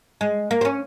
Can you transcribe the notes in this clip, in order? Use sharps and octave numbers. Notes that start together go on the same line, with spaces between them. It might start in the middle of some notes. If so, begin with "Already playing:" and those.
G#3
A#3
C4
C#4